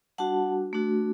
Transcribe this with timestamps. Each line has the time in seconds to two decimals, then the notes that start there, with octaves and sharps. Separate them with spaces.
0.18 G3 D4 F#4 F#5 A5
0.73 A3 D4 F#4